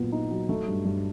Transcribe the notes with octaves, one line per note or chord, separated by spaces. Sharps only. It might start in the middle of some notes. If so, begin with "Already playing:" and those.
Already playing: A#2 F#3 B3
D#4
F#3
A3
G2
G2